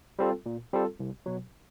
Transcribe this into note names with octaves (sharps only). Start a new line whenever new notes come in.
G3 C4 F4 A4
A#2
G3 C4 F4 A4
C2
B2 F#3